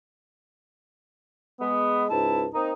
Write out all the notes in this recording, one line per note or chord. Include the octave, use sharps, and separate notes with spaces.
G#3 B3
C#2 G#2 E4 A5
A#3 C4 D#4